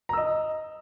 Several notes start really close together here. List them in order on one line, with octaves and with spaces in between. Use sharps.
A#5 E6 D#5